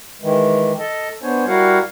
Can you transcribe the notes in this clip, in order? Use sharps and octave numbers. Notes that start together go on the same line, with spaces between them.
D#3 E3 G#3
A4 D#5 A5
B3 D4 C5 C#5 G#5
G3 E4 F#4 A#4 F5 F#5